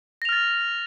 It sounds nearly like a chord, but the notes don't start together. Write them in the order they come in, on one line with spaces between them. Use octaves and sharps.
A#6 F7 F6 A6